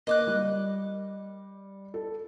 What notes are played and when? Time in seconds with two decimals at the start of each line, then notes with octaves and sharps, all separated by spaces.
0.07 A#3 D#5 D6 F#6
0.27 G3
1.94 A4